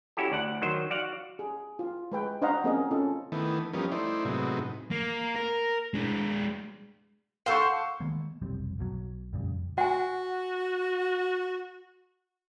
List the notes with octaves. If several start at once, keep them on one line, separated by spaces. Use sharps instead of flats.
C#4 E4 F#4 G4 A4
D2 D5 F#5
D#3 F#3 C5
F#4 D5 F5 F#5
G#4
F4
G#3 B4 G5
D4 C5 D#5 F5 F#5 A#5
A#3 C4 C#4 G#4 A#4 D#5
C#4 F4 A4
D#3 E3 A3 B3
F3 G3 A#3 B3 C#4 D#4
A3 D#4 E4 C5 D5
A2 C3 F#3 G#3 B3 D#4
A#3
A#4
G#3 D4
A4 C5 F5 F#5 C#6
D#3 G#3 A#3 B3
F1 B1 G3 C4
B1 B2 F#3
F2 A#2 C#3 G3
F#4 F#5 G#5